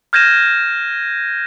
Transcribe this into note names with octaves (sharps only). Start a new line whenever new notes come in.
F6 G6 G#6 A#6 D#7 E7